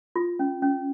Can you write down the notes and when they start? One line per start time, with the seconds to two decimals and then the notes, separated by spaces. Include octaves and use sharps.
0.16 F4
0.39 C#4
0.62 C#4